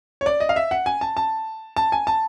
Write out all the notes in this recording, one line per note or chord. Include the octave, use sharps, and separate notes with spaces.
C#5
D5
D#5
F5
E5
F#5
G#5
A5
A5
A5
G#5
A5